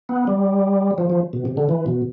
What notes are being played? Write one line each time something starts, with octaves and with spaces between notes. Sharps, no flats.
B3
G3
F3
F3
B2
C3
D3
E3
B2